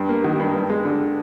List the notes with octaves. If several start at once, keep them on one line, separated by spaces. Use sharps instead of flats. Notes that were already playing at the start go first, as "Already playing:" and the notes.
Already playing: G2
A#3
D#3
G2
G2
G#3
D3